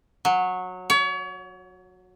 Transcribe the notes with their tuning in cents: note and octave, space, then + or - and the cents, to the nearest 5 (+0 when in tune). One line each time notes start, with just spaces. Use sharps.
F#3 -15
C#5 +35